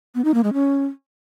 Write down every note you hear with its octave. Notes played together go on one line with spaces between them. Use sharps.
B3
D#4
A#3
G#3
C#4